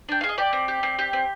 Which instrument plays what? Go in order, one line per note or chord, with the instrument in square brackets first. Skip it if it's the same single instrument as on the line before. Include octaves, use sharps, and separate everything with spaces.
[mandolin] D4 G5
G#4 F5
D#5
G4 D5
C4
G4
C4
G4
C4